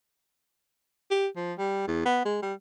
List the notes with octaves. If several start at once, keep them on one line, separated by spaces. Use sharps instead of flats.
G4
F3
G3
E2
B3
G#3
G3